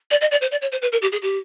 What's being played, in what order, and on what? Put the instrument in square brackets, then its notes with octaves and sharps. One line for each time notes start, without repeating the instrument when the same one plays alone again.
[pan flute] D5
D#5
D5
C5
D5
C#5
C5
B4
A#4
G4
G#4
G4